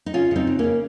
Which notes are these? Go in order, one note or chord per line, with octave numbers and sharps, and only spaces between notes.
D#4
C#3 C#4 F4
C#3 C4 D#4
C#3
C#3 A#3 C#4